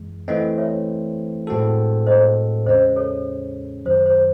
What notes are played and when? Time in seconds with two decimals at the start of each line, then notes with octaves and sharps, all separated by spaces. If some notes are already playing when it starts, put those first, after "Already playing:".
Already playing: F#2 E3 G#3
0.28 E3 A3 C4 D#5 F#5
0.58 C#5 E5
1.47 A2 G#3 C4 F#4 A4
2.06 C5 D#5
2.66 E2 C#3 G#3 C#4 G#4 C5 D#5
2.96 A4 C#5
3.85 F#2 D#3 F#3 C5
4.06 C5